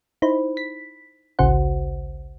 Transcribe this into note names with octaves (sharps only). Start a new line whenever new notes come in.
D#4 E4 C5 B5
B6
A1 D2 C#3 F#4 C5 F#5